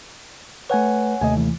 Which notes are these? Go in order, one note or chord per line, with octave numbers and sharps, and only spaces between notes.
A3 B4 C#5 F#5 G#5
D#2 C3 A3 D#5 G#5
E3